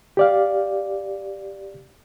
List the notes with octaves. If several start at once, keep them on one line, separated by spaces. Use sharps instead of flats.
G4 D5 F5